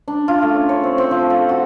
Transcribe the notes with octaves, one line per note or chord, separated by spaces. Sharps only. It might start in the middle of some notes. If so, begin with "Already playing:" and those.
D4
F4
A3
C#4
C#5
C4
C4
F3
A4
F#4